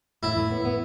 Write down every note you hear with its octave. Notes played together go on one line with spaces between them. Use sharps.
A2 E4
A2
B3
B3